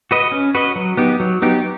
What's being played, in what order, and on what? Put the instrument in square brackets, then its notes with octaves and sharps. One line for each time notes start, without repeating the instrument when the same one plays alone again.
[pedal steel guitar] F#4 B4 D#5
C#4
F#4 B4 D#5
F#3
B3 D#4 G4
F#3
B3 D#4 G4